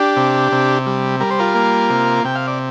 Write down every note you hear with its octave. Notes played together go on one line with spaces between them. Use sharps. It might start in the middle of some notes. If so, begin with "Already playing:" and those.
Already playing: D4 G4
C3
C3
G3
G3 A#4
C5
F4 A#4
A#3
C3
C3 G5
F5
D5